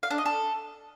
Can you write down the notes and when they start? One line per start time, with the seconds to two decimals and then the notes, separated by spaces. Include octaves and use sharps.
0.03 F5
0.11 D4
0.18 D#5
0.26 A4